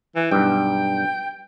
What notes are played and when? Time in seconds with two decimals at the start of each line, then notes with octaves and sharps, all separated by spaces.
0.16 E3
0.31 B1 G2 G5